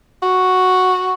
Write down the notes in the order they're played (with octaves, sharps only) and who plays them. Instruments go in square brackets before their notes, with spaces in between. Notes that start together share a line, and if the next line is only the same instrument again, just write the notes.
[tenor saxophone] F#4